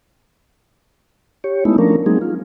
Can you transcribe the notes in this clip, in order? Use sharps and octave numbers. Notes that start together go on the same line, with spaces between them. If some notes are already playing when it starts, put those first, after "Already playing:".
G4 C#5
G#3 A3 B3 D#4 E4
F3 A3 C#4 D4 A#4
F#3 G#3 A#3 C4 D#4 G#4
F4